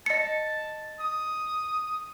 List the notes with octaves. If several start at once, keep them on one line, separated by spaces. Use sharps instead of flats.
D#5 A5 C#7
D#6